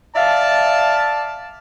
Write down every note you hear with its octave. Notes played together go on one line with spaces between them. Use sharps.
D5 E5 F5 A5